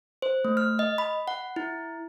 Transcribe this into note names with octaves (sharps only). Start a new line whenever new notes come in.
C5
A3
F6
D#5
B5
F#5
E4